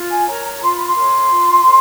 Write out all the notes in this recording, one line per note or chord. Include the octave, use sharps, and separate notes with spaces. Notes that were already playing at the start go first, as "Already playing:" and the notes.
Already playing: F4
G#5
A#4 C#5 A#5
A#5
F4 C6
B5
C6
A#4 C#5
F4
A#4 C#5